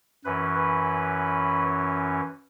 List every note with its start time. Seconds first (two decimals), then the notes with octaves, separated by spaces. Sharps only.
0.25 F#2 E3 C#4 B4
0.56 B4